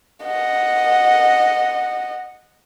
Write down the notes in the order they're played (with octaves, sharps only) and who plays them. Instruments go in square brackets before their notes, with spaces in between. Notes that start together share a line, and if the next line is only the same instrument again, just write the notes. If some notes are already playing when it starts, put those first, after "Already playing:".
[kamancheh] D#5 F#5